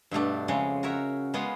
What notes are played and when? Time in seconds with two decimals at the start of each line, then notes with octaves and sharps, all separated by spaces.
0.11 G2 B2 A3 D4
0.48 F2 C#3 G#3 C#5
0.83 F#4 A#4 C#5 E5
1.34 G#3 B3 C#4 F4 C#5 D#5